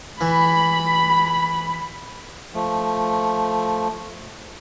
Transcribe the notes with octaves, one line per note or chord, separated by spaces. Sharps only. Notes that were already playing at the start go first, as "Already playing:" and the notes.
E3 B5
F3 A3